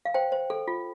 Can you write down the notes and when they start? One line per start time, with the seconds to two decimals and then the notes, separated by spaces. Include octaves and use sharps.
0.05 F5
0.14 C5 G5
0.32 C5
0.50 A4
0.68 F4